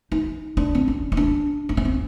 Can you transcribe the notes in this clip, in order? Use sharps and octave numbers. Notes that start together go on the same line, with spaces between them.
D#4
D4
C4
C#4
D#4
D4
D4
C#4
C4